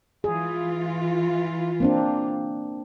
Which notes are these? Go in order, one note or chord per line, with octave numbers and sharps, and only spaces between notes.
E3 F4 G#4
A#3 C4 D4